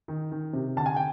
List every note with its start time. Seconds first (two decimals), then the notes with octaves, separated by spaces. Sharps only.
0.08 D#3
0.32 D#3
0.53 C3
0.77 D3 A5
0.86 G#5
0.96 G5